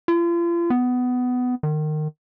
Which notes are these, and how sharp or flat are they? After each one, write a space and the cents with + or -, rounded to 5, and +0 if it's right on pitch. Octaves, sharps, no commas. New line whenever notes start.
F4 -40
B3 +15
D#3 -25